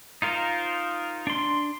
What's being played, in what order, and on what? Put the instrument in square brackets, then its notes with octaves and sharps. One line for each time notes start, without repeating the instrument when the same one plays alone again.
[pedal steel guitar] D#4 F4 A#4 C5
D4 C6